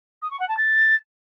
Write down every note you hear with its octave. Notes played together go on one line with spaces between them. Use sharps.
D#6
C#6
F#5
A5
A6